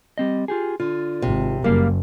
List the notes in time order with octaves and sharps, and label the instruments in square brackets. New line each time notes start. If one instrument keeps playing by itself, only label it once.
[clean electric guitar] G3 C4 D#5
F4 G4 G#4
[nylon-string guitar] D3 [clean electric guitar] F4
[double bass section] G#1 [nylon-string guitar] C3
[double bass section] F#1 [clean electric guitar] G3 A#4 F5 [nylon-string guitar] A#3